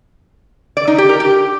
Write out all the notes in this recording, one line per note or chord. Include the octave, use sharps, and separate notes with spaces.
D5
D#4
G4
A#4
G4